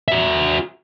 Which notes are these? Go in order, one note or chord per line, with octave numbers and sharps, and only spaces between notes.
F#4 E5